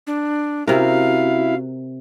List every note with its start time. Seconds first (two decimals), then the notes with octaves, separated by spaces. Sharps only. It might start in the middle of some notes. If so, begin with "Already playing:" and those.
0.07 D4
0.68 C3 C#4 E4 F#4 A#4 F5